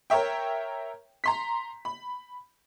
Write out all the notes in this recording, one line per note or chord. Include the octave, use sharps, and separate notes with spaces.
A#4 C#5 E5 G5
A#5 C6 B6
B5